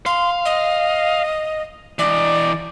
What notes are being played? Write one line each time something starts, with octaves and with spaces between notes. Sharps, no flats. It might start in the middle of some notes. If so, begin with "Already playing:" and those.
F5 C6
D#5
E3 D5 D#5